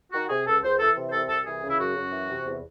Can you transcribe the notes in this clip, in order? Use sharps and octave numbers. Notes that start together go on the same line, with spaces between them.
D#3 F#4
C3 G#4
C#2 A4
C#2 C5
E3 A4
C3
C5
C2 A4
C2 A4
E3 G#4
C#3
E4
F#2 F#4
F#2
E3
C3
E2